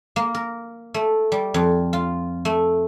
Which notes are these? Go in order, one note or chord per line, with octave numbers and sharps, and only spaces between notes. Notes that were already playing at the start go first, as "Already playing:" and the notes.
A#3
A#4
A3
G3
F2
F4
A3